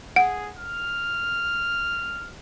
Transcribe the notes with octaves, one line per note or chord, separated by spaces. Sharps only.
G#4 F#5
F6